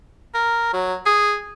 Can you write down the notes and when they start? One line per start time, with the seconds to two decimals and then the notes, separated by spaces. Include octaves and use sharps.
0.34 A#4
0.73 F#3
1.06 G#4